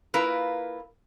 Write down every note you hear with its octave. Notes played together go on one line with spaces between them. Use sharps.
A#3 E4 F4 A#4 B4